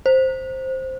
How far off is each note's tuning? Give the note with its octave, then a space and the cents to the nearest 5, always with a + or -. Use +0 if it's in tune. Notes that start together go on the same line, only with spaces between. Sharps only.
C5 +5